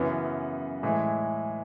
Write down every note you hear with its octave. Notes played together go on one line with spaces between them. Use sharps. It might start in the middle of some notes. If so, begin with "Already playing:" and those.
Already playing: F#2 C#3 E3 B3
A2 E3 G#3